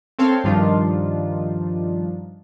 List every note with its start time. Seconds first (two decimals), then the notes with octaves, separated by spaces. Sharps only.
0.19 C4 A4 C#5 F5 G5 C6
0.44 G2 D#3 F3 D4 D#4 F4